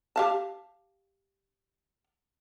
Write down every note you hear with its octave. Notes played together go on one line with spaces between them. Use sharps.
G4 F5 A5